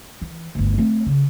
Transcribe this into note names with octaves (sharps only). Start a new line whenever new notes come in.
E3
G1 D2
A3 C4
C#3